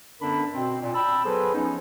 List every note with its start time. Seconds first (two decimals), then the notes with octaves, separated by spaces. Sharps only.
0.21 F#2 D3 B3 D4 A#4 B5
0.53 B2 C4
0.81 A#2
0.94 G5 A5 B5 E6
1.24 F#3 B3 G#4 A4 B4 C5
1.53 E2 F3 B3 C#4 D#4